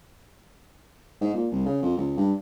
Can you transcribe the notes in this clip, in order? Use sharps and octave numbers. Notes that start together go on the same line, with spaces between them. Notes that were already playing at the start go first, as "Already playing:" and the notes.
G#2
A#2
C2
C#3
F2
C#2
G2